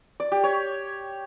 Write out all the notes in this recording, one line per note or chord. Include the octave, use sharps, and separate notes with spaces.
D5
G4
C#5